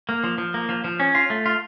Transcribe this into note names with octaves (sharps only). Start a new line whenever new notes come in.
A#3
F3
F3
A#3
F3
F3
C#4
F4
A3
F4